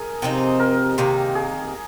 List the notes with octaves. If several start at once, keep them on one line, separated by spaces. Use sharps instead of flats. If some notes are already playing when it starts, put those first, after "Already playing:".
Already playing: G#4 A#4
C3 F3 C4 D#4
A#4
C3 D#3 A#3
G#4